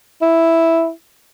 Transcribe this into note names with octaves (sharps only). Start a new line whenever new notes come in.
E4